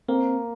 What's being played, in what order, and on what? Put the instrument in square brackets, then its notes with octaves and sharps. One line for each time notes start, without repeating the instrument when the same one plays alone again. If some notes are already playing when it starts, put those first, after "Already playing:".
[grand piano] A#3 [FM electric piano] C4